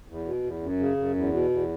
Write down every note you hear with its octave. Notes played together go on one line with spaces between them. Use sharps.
E2
B2
E2
F#2
C#3
F#2
E2
B2
E2